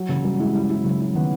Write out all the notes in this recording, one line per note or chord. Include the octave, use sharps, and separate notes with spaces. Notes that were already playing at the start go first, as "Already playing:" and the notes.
Already playing: F#3
C#3 E3
F#3 G3
G#3 E4
G3 E4
E4
C#3 F#3
E4
D#3 B3